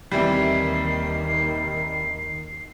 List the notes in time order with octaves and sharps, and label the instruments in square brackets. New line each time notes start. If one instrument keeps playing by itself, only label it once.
[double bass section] D#2 D#3 [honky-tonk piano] C3 E3 G3 [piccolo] C7